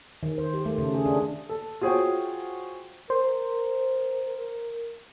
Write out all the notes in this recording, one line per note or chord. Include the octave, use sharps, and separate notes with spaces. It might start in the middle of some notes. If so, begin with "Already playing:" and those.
D#3
C5
G4
A3
C#3
G#4
D4
A4
F4 F#4 G#4 C5 C#5 G5
A#4 C5